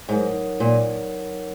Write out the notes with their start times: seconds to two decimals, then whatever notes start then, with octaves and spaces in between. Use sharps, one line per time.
0.08 G#2 F#3 D#4 A#4 C#5 F#5
0.60 A#2